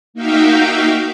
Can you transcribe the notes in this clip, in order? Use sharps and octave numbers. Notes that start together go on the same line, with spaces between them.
A#3 D#4 F#4 E5 F5 G5